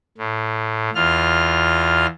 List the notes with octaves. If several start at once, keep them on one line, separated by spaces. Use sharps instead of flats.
A2
E2 F4 F6